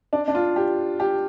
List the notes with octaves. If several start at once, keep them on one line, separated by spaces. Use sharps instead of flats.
D4
D4
F4
G4
G4